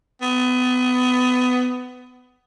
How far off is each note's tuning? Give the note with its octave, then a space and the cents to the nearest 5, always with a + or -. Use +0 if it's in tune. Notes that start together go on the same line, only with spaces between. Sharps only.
B3 +25